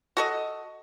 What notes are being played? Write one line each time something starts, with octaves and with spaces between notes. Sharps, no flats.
F#4 A4 D#5